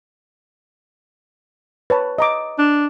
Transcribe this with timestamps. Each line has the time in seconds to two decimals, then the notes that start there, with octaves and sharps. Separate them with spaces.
1.90 B4 C#5 A5
2.18 D#5 A#5 D6
2.59 D4